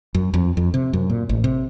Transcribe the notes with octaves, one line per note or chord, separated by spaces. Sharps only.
F#2
F2
F2
C3
F#2
A#2
A1
C3